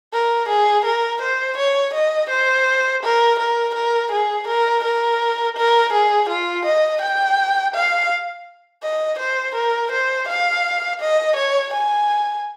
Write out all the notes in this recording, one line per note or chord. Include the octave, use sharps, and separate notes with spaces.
A#4
G#4
A#4
C5
C#5
D#5
C5
A#4
A#4
A#4
G#4
A#4
A#4
A#4
G#4
F4
D#5
G5
F5
D#5
C5
A#4
C5
F5
D#5
C#5
G#5